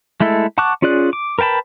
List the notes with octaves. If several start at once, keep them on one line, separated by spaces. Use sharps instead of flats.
G#3 A3 E4 A4
F#5 A5 C#6 D6 F#6
C#4 F4 G#4 D5 F#6
D6
A#4 B4 G5 A5 B5